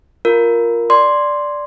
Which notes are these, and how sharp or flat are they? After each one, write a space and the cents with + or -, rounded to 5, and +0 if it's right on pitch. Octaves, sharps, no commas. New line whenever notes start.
F4 +0 A#4 +0
D5 +0 C6 +0